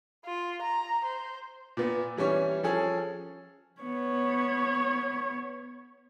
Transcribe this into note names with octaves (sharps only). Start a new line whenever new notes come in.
F4
A#5
C5
A#2 B3
E3 G3 C#4 C#5
F3 C#4 G#4 A4
B3 C#5